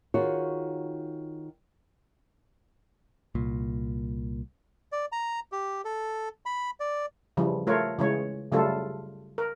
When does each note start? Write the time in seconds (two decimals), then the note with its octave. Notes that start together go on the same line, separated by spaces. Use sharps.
0.14 D#3 F4 F#4 G#4 C#5
3.35 C2 A#2
4.92 D5
5.12 A#5
5.52 G4
5.85 A4
6.46 B5
6.80 D5
7.37 C#3 E3 F3 G3
7.67 A3 F4 A#4 C#5
7.99 C#3 E3 G#3 C#5
8.52 C#3 F#3 G3 A3 F4 A4
9.38 A#4